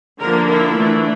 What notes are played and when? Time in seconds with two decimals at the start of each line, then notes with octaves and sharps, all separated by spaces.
0.20 D3 F3 A#3 D4 A#4
0.48 E4
0.76 E3 A3 D4